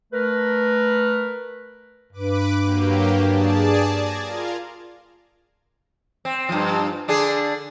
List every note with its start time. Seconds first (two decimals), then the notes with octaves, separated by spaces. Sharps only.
0.13 A3 A#4 B4
2.13 G2 B4 D6
2.62 F#3 A#3 G4
3.27 G#4 D5 A5
3.94 G#6 A#6
4.25 F4 A#4 F5
6.25 C4
6.49 G2 F3
7.08 D3 D4 G#4